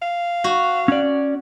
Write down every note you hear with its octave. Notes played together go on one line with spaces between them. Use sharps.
F5
F#4
C#4 D5